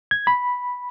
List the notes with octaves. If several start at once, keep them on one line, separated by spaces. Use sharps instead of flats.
G#6
B5